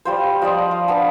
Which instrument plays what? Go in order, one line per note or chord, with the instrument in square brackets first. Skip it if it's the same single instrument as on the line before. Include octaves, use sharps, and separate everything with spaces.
[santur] G3 F4 C5
F3 D5 D#5
F5
B3 D4 A5